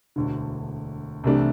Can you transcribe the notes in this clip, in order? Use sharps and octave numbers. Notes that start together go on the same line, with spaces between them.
E1 D2 D3
C2 C3 E3 A3 D4